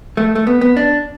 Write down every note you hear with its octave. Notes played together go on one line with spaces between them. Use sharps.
A3
A3
B3
B3
D4